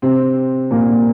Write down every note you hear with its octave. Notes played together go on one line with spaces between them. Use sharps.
C3 C4
A#2 A#3